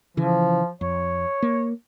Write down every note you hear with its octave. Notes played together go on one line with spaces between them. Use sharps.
C#3 E3 F3
F2 C#5
A#3